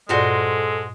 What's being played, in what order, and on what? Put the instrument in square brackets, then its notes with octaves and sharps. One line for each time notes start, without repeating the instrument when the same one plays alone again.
[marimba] G2 A#2 D5 [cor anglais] G#3 [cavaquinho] F#4 G#4 C5 [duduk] A4